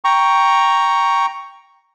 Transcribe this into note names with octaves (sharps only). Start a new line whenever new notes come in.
G5 A#5 C#6